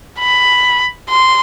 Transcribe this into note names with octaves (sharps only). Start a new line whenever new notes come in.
B5
C6